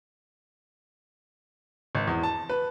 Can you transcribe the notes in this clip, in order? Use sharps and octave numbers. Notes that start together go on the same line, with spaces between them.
G#1
E2
A5
B4